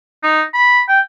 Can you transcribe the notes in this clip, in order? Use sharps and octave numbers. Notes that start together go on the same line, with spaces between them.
D#4
B5
G5